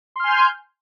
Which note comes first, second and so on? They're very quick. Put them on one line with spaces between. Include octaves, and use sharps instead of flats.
C6 F6 G#5 G6